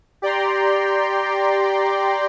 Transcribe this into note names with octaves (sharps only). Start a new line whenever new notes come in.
G4 D5 G5 A#5 C6